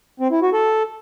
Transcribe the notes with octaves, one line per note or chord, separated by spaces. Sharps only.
C4
E4
F#4
A4